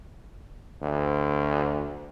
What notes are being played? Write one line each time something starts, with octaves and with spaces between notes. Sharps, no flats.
D2